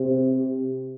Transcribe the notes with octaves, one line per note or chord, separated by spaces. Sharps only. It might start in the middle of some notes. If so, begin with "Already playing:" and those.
Already playing: C3